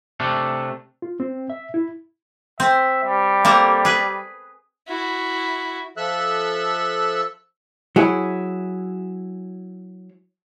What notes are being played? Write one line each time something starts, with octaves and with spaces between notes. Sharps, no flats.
C3 A3 D4
F4
C4
E5
E4
C4 E5
G3
A#3 C4 A4
G#4 B4
E4 F#4
F3 A4 E5 E6 F#6
F#3 E4 G#4